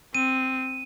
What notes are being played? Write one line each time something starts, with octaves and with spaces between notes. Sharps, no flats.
C4 D#7